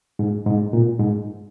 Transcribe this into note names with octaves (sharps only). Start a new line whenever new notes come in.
G#2
G#2
A#2
G#2